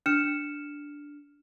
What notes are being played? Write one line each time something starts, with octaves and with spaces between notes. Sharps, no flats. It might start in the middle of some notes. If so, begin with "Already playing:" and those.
D4 F6 C#7 E7